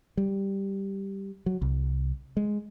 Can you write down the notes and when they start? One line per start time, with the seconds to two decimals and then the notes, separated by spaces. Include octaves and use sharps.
0.17 G3
1.46 F#3
1.62 C2
2.37 G#3